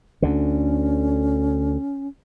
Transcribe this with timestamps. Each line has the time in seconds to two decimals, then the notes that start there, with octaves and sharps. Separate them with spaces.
0.22 D2 D3 C#4